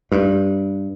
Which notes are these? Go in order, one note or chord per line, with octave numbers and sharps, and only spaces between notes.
G2